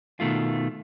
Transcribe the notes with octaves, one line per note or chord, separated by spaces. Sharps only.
B2 D#3 A3 F4